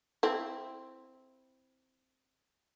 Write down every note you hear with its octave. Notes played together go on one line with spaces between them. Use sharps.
C4 E4